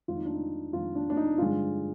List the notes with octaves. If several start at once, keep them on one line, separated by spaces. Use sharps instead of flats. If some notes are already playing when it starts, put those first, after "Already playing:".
F2 D#3 G#3 F4
D#4
D4
D#4
F2 D#3 G#3 F4
D4
D4
D#4
G2 D3 F3 G#3 F4